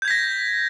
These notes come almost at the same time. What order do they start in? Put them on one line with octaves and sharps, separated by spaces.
G6 G#6 B6 A#6